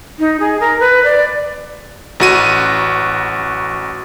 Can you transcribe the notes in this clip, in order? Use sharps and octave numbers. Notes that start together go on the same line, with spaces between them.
D#4
G#4
A#4
B4
D5
A1 F#4 D#7